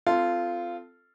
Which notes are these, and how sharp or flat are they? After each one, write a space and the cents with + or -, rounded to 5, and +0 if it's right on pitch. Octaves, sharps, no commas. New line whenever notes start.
C4 -25 F4 -10 A4 +0